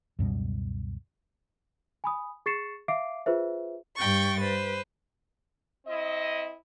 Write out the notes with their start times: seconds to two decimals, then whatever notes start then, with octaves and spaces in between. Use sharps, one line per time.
0.19 C#2 F#2 B2 G3
2.04 G#5 B5 D#6
2.46 G#4 C#6 A6 C7 C#7 E7
2.88 E5 F5 D6 C7 D7
3.26 F4 G#4 B4 C5 E5
3.96 G2 G5 C#6 A6
4.40 B4 C5
5.87 C4 E4 D#5